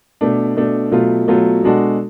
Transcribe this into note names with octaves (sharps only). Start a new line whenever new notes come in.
B2 A3 D4
B2 A3 D4
B2 F#3 A3 F4
B2 F#3 A3 F4
B2 G#3 D4 F#4 A4